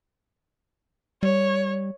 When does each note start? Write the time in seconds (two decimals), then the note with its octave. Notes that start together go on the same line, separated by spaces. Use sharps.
1.23 G3 C#5